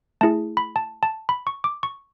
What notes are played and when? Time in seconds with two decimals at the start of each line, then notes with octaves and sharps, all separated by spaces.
0.21 A3 E4 G#4 A5
0.57 B5
0.76 A5
1.03 A5
1.29 B5
1.47 C#6
1.64 D6
1.83 C#6